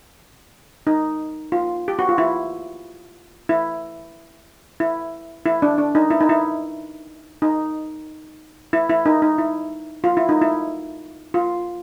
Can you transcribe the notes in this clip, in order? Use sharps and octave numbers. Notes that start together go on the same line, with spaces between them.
D#4
F4
G4
F#4
F4
E4
E4
E4
E4
D4
D4
D#4
E4
D#4
E4
D#4
E4
E4
D#4
D#4
E4
F4
E4
D#4
E4
F4